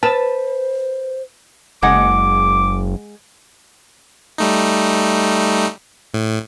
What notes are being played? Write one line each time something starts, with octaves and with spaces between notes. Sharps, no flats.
B4 C5 A5
F#1 G#3 F#5 D6
G3 A3 D#4
A2